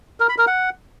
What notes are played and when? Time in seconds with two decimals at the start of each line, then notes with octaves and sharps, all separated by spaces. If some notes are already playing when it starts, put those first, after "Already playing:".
0.20 A#4
0.29 B5
0.38 A#4
0.47 F#5